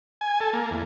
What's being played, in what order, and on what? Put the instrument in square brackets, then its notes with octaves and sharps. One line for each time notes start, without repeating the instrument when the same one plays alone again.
[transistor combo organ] G#5
A4
A#3
E2